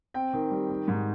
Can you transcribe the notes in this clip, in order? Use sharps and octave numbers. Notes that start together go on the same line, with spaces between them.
C4 G5
D#3
G3
D#3
G#2